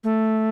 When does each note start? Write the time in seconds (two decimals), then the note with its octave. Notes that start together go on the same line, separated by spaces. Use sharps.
0.04 A3